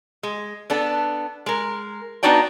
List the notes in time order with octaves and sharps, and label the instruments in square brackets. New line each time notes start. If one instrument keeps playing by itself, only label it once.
[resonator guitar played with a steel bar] G#3
B3 D4 A4
G#3 A#4
B3 D4 D#4 F#4 D5 G5